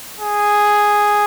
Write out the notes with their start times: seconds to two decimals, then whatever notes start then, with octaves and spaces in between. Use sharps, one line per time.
0.20 G#4